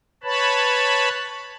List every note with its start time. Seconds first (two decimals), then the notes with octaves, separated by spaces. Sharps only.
0.24 B4 C#5 A5 B5